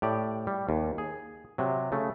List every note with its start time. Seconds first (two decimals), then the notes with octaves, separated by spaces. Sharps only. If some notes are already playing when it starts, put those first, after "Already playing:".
0.02 A2 G4 D5
0.47 G3
0.69 D#2
0.98 G#4
1.58 C3 F#3
1.92 C#3 A3